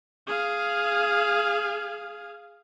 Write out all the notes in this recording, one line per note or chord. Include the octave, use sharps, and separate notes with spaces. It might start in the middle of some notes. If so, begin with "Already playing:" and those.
G#4 F5